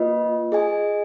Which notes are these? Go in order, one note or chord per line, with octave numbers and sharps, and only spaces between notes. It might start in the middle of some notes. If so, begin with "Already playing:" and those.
Already playing: A#3 F4 B4 D#5
G#4 D#5 G#5